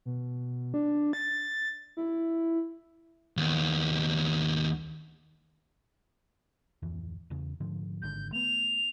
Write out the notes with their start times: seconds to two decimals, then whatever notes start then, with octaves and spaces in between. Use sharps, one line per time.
0.06 B2
0.74 D4
1.13 A6
1.97 E4
3.37 D#2 B3
6.82 D1 F2 E3
7.30 E2 C#3
7.60 G#2 D3 F3
8.02 G#1 G#2 D3 G6
8.32 A3 B3 F7